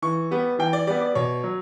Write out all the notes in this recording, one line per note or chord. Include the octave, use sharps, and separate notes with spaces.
E3 C#6
G3 B3
E3 G5
D5
G3 B3 D5
D5
B2 C#5
F#3